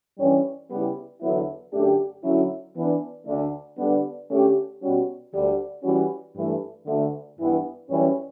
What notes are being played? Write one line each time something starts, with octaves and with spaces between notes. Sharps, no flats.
G2 E3 G3 C#4
C#3 G3 B3 E4 G4
E2 D3 F#3 B3 E4
F#2 D3 A3 D4 G4
D3 F#3 C#4 E4
E3 B3 D4
D2 D3 A3 D4
D3 G3 B3 D4
D3 A3 C#4 G4
B2 G3 C#4 F#4
D2 D3 G3
E3 G3 C#4 F#4
G2 E3 A3
D2 D3 A3
G2 E3 B3
F#2 E3 G3 C#4